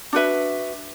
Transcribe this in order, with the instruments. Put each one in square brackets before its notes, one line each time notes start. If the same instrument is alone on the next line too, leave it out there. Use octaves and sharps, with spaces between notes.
[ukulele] D4 F#4 B4 E5